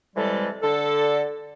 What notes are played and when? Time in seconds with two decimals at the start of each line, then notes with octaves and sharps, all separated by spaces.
0.16 C3 E3 G3 G#3 A4
0.63 D3 A4